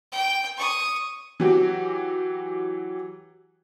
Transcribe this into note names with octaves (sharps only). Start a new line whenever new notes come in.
G5
C#6 D#6
E3 F#3 F#4 G4